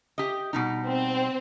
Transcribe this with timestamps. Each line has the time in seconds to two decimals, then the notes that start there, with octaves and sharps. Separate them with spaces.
0.18 G4 D#5
0.53 B2 G3 D#4
0.86 C4